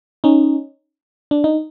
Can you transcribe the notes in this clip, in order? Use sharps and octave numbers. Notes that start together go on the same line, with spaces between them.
C#4 D#4
D4
D#4